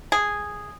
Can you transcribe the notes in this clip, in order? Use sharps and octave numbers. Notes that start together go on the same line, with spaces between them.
G#4